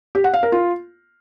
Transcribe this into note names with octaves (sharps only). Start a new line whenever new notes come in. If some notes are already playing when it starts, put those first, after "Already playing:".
G4
F#5
F5
A#4
F4